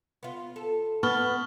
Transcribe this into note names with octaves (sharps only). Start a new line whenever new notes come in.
B3 F4
A4
B3 A5 C#6 F6 G7